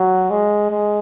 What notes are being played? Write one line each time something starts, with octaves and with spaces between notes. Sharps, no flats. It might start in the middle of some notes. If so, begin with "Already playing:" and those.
Already playing: F#3
G#3
G#3